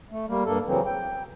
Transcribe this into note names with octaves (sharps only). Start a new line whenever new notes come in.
A3
G3 A#3
G2 A#3 A4
C#3 E3 F#3 C4
G5